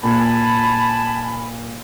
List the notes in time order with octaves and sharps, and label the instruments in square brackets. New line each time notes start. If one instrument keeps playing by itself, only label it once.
[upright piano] A#2 [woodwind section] G#5 A5 B5